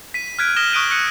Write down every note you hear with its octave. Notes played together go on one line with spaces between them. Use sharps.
B6 D#7
F6 F#6 G#6 B6 D7
D#6 F6 A#6 E7 G7
C#6 D#6 F#6 D7 D#7 G7
C#6 E6 F#6 C#7 D#7